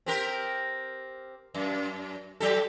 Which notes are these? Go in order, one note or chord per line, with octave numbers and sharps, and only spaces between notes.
C4 G4 A#4
F#2
F#3 G4 A4